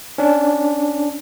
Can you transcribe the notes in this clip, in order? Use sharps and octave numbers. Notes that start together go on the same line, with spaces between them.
C#4 D4